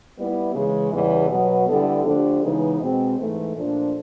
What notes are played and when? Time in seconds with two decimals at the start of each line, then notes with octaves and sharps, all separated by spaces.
0.17 G3 B3 E4
0.53 C#3 E3 G#3
0.92 E2 C#3 E3 G3 B3
1.29 B2 F#3 B3
1.67 D3 G3 B3 E4 A4
2.05 D3 F3 A3 D4 G4
2.42 C#3 E3 G#3 B3 D#4
2.79 B2 G#3 C4
3.17 G#2 E3 A3
3.55 A#2 F3 A3 D4